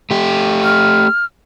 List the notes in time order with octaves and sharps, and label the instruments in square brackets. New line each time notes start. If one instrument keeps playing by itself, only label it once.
[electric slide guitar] A3 G4
[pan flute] F6